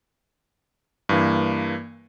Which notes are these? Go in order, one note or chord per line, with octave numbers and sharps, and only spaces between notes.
G2 E3 A#3